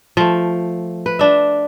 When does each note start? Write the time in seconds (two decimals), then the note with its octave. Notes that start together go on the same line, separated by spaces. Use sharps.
0.17 F3 A3
1.06 B4
1.19 D4 E5